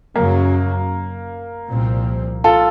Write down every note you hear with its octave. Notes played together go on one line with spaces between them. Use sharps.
F#2 C#3 F#3 A#3
C2 A#2 F3 C4
F4 A4